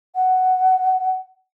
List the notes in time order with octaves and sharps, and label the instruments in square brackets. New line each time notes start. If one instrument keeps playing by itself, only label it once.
[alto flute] F#5